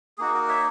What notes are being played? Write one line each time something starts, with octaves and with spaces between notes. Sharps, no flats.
A#3 D#4 F#4 G#4
F#4 A#4
C#5 E5